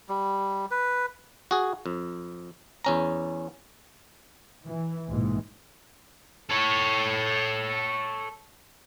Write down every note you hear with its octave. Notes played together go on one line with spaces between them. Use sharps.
G3
B4
F#4 G#4
F2
E2 C#4 A#5
E3
A#1 G#2 B2 E3
A4 C#5